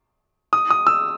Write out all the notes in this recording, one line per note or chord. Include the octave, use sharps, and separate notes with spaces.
D#6
D#6
E6